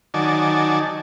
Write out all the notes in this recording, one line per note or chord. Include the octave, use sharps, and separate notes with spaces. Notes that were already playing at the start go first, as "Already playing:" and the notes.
D#3 F#3 D5 G#5 A5